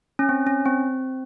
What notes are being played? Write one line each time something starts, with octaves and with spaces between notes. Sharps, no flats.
C#4
C4
C#4
C4